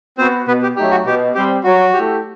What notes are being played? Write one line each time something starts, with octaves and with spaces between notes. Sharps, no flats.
B3 C4 F#4 C5
B2 B3 B4
G4
F#3 A3 D#4 G4
F#4
B2 G4
G3 C4 G4
F#3 F#4
A3 E4 G4